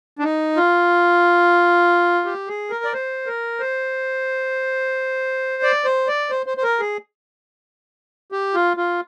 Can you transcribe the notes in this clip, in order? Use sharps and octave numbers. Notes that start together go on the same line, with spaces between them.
D4
D#4
F4
G4
G#4
A#4
D5
C5
A#4
C5
D5
C5
D5
C5
C5
C5
A#4
G#4
G4
F4
F4